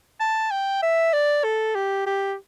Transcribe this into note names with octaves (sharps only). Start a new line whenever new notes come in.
A5
G5
E5
D5
A4
G4
G4